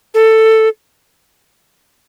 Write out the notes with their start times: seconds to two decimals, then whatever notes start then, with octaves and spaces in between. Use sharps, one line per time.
0.14 A4